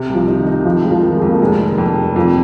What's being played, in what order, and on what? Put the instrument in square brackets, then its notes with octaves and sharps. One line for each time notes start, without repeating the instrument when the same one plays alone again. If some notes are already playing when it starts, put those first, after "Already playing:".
Already playing: [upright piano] C3
C2
[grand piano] F3
[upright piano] D#4
[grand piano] D#3
[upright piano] D#4
[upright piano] F2 [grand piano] F3
[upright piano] G#3
[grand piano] F3
[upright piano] D#3
[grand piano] G#3
[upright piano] F2
[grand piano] A#3
[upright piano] F1 [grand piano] G#3
[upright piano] D#3
F2
F1
[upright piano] F2 [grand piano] F3